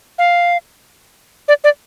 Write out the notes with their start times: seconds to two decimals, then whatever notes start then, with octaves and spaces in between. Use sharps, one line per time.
0.18 F5
1.48 D5
1.64 D5